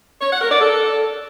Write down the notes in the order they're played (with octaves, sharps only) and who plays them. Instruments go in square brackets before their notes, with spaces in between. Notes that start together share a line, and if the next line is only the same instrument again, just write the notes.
[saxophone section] C#5
F#5
A#4
D5
A4